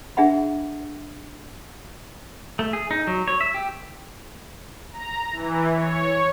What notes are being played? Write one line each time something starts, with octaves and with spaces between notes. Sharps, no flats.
D4 G#4 E5 F#5 B5
A3
G#4
D#4
F#3
C#5
E5
G4
A#5
E3
C#5